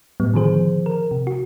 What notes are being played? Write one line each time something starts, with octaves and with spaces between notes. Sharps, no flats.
A2 G3 B3
D3 D#3 F3 G#4 C5
A#4
C3
F#4